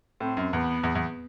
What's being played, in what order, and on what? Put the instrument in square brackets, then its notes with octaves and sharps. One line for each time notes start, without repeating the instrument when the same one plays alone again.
[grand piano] A2 [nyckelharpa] C4
[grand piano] F#2
[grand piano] E2 [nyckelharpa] B3
[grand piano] E2
E2